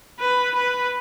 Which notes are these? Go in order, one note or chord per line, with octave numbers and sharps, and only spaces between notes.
B4
B4